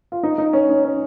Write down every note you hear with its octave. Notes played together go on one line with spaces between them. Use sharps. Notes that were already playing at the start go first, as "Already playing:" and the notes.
F4
D#4
D#4
C#4
D#4
C#4